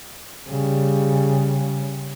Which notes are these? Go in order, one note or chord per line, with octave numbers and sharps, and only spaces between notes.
C#3 G3